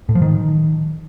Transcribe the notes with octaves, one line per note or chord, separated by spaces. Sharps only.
A2
F3
D#3